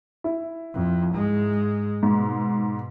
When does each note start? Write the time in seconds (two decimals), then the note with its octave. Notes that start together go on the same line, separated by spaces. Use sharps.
0.24 E4
0.74 F2
1.14 G#2 G#3
2.03 G#2 B2